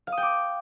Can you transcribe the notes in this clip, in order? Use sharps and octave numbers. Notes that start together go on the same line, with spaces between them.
F5
D#6
G5
D6